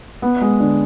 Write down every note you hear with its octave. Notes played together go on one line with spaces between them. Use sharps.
B3
G#3
D3